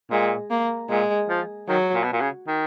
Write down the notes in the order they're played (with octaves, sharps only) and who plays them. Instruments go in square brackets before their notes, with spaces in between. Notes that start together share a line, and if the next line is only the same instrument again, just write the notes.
[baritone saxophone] A#2 [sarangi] G#3
[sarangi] A#3
[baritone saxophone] A#2 [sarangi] G#3
[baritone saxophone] F3
[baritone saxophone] D#3 [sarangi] F#3
[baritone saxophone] A#2
B2
A#2
C#3
D#3